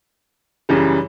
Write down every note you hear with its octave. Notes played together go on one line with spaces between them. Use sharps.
F#2 C#3 E3 G3